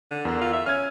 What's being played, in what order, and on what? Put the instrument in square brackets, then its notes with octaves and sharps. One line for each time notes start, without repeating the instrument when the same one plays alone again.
[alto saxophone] D3
[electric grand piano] E2 A#4 E6
[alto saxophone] F4
E5
[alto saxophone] C#4 [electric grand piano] F6 G#6